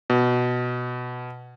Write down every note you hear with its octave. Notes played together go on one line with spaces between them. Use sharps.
B2